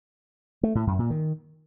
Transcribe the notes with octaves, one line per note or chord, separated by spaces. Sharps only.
A3
A2
F#2
A#2
D#3